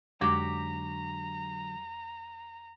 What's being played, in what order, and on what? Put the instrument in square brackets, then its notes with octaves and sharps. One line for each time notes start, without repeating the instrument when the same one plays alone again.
[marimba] F2 G#3 [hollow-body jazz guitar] D3 F#3 [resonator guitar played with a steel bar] F#4 G4 [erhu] A#5